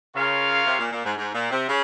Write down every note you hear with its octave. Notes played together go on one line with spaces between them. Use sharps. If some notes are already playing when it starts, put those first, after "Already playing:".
C#3 F4 A#4 C#5 F5
C3
A#2
A#2
G#2
G#2
A#2
C3
C#3